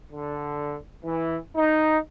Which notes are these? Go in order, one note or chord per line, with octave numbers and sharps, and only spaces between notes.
D3
E3
D#4